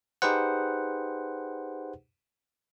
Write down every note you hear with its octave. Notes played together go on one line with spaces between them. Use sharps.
D#4 G4 G#4 B4 C5 F#5